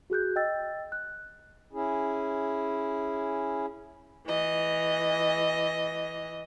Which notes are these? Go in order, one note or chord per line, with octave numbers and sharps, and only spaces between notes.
F#4 G#4 F#6 G6
D#5 G5 E6 A6
F#6
C#4 E4 G#4
E3 D#5